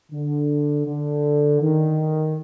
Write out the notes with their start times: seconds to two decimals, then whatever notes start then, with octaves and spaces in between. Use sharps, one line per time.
0.11 D3
0.86 D3
1.60 D#3